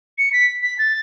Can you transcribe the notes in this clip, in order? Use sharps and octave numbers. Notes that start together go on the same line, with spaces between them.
C#7
B6
B6
A6